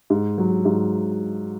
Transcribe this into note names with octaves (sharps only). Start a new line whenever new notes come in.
G#2
F#3
G#2